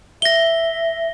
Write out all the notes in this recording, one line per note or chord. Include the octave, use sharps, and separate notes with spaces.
E5 A#6 G7